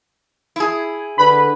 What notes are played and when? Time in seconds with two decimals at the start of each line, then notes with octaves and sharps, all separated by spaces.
0.56 E4 G#4
1.18 D3 B4 B5